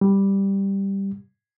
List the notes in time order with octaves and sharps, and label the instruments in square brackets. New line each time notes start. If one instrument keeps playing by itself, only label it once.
[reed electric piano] G3